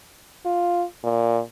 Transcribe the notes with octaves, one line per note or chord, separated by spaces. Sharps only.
F4
A#2